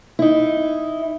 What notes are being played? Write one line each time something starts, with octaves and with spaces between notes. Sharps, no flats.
D#4 E4